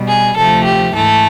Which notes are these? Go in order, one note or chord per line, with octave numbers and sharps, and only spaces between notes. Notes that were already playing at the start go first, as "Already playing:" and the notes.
Already playing: B2 G3
G#4
D2 C3 F3 A3 A4
G4
G#2 E3 A3 A4